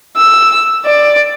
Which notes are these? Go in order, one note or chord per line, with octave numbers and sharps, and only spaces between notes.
E6
D5